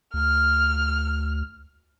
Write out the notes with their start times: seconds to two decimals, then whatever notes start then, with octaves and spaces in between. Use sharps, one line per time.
0.14 D2 F6